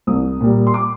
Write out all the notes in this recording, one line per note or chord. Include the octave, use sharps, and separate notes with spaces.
C2 D#6
A#2 G3
C6
D6